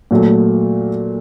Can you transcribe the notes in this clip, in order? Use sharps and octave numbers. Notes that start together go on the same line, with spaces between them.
A#2 F#3 A3